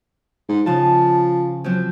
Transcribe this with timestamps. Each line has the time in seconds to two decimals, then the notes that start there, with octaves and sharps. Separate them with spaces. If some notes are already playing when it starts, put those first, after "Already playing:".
0.49 G#2
0.66 C#3 F3 A5
1.64 F3 F#3 C4